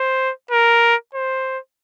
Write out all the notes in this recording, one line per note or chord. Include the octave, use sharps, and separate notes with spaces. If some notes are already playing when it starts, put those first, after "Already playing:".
Already playing: C5
A#4
C5